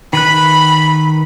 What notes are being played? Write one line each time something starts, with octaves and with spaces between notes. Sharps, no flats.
D#3 B4 B5 F#6